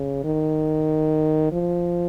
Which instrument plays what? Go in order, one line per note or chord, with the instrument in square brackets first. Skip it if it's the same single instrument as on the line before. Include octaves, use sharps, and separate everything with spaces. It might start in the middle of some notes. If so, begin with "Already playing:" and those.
Already playing: [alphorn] C#3
D#3
F3